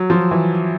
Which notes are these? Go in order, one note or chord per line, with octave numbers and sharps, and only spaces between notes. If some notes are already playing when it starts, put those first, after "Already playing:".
Already playing: F#3
F3
E3